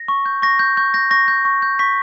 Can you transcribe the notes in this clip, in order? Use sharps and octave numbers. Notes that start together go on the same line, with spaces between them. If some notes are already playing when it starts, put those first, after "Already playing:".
Already playing: A#6
C#6
G6
C#6 A#6
G6
C#6 G6
G6 A#6
C#6 A#6
G6
C#6
G6
C#6 B6